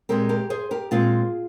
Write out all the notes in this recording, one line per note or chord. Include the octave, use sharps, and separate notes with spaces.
A#2 G#3 C4 G4 A#4
G4 A#4
G#4 C5
G4 A#4
A#2 G#3 C4 F4 G#4